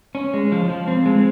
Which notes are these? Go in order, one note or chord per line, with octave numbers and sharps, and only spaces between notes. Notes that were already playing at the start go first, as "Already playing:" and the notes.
C#4
G#3
F3
F3
C4
G#3